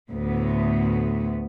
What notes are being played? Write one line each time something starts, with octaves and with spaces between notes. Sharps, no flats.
D2 A2 B3